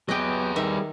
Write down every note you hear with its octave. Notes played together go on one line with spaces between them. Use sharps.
F#3 B3 G4 G#4 B4 D#5 G5
D#3 G3 E5